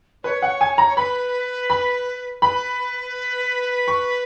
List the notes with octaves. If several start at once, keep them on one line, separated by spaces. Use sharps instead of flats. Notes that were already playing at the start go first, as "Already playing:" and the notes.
B4 C#5
F#5
G#5
A#5
C#5
B4 B5
B5
B4 B5
C#6